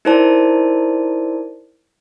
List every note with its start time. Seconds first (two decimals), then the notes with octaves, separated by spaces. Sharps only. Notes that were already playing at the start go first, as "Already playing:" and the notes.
0.05 D#4 E4 A#4 C5 D5 A5